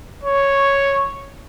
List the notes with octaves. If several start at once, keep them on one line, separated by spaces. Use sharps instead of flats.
C#5